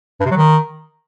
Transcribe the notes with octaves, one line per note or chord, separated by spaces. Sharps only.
G2
C3
F#3
D#3